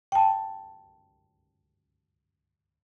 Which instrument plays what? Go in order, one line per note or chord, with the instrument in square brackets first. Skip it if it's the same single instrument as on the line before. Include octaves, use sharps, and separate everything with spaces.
[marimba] G5 A5